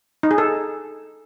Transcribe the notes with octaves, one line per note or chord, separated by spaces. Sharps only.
D#4
G#4
A4